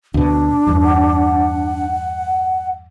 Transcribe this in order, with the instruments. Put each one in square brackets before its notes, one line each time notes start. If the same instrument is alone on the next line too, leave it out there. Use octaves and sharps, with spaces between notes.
[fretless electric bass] D2 B2 [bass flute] D4
[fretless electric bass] E2 G2
[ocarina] F#5